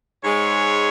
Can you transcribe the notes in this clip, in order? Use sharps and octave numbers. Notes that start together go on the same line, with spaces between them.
G#2 G#3 C#5